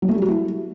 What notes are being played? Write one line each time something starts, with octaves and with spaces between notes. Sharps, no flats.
F#3
A3
G3
F#4
E4